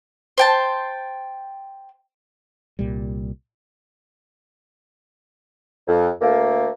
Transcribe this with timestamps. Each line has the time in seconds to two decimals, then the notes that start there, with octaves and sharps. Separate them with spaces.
0.38 C5 G5 A5
2.79 C2 A#2 G3
5.88 F2
6.21 D2 A3 A#3